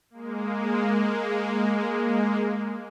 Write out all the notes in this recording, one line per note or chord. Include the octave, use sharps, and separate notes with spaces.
G#3 A#3